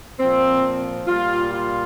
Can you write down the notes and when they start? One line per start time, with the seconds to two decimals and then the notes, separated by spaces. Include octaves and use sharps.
0.20 A#2 F3 C4
1.08 A#2 G3 F4
1.51 F4